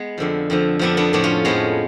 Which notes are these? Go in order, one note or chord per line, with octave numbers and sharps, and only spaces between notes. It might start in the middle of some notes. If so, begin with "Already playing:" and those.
Already playing: G#3 B3
F2 D3 F3
F2 D3 F3
F2 D3 F3 B3 D4
B3 D4
A2 F3 B3 D4
C#4 F4
A2 F3 G#3 B3